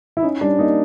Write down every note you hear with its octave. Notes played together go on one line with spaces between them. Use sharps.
E4
C#4 D#4
G3 D4
A#3 D#4